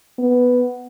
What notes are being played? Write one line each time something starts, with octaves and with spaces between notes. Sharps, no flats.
B3